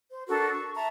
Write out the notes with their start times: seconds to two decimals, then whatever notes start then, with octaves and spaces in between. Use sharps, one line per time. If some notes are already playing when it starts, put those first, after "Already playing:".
0.11 C5
0.27 D4 F#4 A4 A#4
0.53 C#6
0.75 E5 A5 A#5